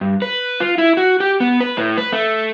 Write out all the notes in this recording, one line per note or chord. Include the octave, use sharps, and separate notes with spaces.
G2
B4
F4
E4
F#4
G4
B3
B4
A2
B4
A3